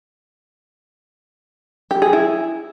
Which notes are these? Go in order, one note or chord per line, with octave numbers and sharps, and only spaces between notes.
G4
G#4
E4